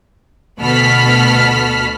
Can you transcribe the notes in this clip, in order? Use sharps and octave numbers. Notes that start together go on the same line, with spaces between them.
D2 B2 A4 B5 F6 B6